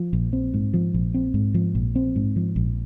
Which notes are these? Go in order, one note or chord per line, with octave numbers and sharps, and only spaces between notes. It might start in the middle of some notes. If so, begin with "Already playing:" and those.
Already playing: F3
A#1
C4
G#2
F3
A#1
C4
G#2
F3
A#1
C4
G#2
F3
A#1